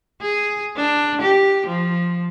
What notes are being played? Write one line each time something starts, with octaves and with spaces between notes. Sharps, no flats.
G#4
D4
G4
F3